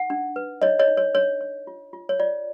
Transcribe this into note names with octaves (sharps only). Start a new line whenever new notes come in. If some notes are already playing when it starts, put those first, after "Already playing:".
Already playing: D#4 F#5
D4
B4
D#4 C#5 D#5
C#5 D#5
D#4
C#5
D4 C#5
C#5
F4
F4
C#5
F4 D5